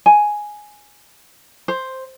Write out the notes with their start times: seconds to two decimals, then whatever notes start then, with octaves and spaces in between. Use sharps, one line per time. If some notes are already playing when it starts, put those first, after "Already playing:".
0.06 G#5
1.68 C5